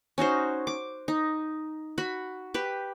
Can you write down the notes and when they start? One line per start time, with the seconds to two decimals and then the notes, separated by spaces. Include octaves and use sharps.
0.18 C#4 D#4 F#4 C5
0.67 D6
1.08 D#4
1.98 F#4 B5
2.54 G4 B4